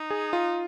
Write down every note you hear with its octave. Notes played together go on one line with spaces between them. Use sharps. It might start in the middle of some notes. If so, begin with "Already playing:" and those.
Already playing: D#4
G#4
F4